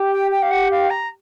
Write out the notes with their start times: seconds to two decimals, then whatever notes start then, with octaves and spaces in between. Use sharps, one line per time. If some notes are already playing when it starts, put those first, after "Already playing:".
Already playing: G4
0.12 G5
0.31 G5
0.42 F5
0.51 F#5
0.71 F5
0.90 A#5